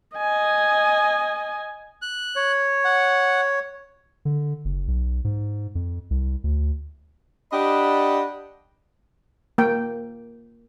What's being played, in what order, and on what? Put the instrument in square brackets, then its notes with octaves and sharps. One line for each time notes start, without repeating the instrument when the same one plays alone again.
[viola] D#5 G#5
[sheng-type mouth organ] F#6
[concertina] C#5
[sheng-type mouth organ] F#5
[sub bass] D3
F#1
B1
G#2
F2
C2
D2
[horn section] D4 G4 D5 D#5 F#5 B5
[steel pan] A#3 G5